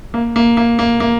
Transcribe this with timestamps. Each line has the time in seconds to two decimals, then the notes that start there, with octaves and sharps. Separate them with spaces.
0.14 A#3
0.36 A#3
0.57 A#3
0.79 A#3
1.00 A#3